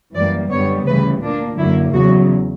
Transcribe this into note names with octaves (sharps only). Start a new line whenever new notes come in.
F#2 E3 G3 A#3 D5
F#2 D3 G3 B3 C#5
D2 C#3 E3 G3 B4
A#2 A#3 D4
F#2 D3 F#3 A#3 E4
E2 C#3 F#3 F#4